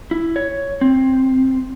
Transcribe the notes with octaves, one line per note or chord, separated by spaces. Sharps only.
E4
C#5
C4